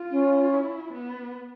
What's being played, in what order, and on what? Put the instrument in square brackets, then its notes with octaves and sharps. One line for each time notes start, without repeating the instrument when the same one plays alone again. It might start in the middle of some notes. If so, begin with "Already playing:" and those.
Already playing: [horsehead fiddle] F4
[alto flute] C#4
[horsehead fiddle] E4
B3